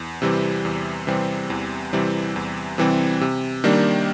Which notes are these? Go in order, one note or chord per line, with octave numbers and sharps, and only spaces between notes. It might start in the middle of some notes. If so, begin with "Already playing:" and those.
Already playing: E2
C3 E3 G3 C4
E2
C3 E3 G3 C4
E2
C3 E3 G3 C4
E2
C3 E3 G3 C4
C3
D#3 G3 A#3 D4